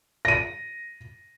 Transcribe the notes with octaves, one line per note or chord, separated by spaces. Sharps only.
A#6 D#7